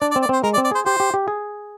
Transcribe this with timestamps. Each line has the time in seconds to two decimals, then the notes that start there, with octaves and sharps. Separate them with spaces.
0.01 D4 D5
0.11 D5
0.16 C4
0.22 D5
0.29 C4 C5
0.44 G#3 A#4
0.54 D5
0.58 C4
0.65 D5
0.71 G#4 C5
0.86 G4 C5
1.00 G4
1.14 G4
1.28 G#4